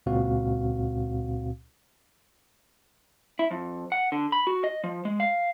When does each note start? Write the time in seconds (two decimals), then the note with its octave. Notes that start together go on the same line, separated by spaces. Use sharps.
0.06 C#2 A#2 C4 F#4 F5
3.39 E4
3.51 F2
3.92 F#5
4.12 D3
4.32 B5
4.47 F#4
4.64 D#5
4.84 F3
5.05 G#3
5.20 F5